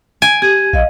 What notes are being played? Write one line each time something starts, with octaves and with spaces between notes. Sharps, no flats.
G#5 D7
G4 G#6 D#7
A#1 D#5 F5